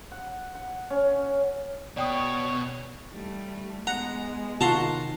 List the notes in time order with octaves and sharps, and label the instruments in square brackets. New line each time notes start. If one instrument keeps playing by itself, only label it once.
[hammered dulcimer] F#5
F#5
C#4
[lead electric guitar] B2 [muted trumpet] C#5 [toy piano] D5 G5 D#6
[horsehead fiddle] G3 A3
[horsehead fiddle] G#3 B3 [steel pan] F#5 [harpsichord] A#5
[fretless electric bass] C3 D#3 [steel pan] F4 F#4 [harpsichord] A5 A#5 C6